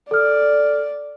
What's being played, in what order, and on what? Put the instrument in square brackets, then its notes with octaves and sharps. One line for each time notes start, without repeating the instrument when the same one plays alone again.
[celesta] A4 F6 [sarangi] D5